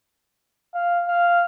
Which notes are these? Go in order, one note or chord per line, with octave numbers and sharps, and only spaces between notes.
F5
F5